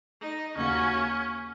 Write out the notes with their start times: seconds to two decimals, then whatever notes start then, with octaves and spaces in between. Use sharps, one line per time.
0.21 D#4
0.57 D#2 C#3 A#3 C#4 F#4